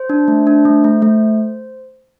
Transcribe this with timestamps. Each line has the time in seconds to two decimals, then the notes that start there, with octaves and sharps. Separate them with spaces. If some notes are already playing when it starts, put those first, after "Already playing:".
Already playing: C5
0.10 D4
0.28 A3
0.47 D4
0.65 A3
0.84 A3
1.02 A3